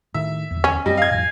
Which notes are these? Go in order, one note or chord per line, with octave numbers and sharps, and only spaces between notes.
A2 D#3 E5
D1 E2
C#4
F#2 G3 C4 D#5
F5 G#6
F2 A2 G#5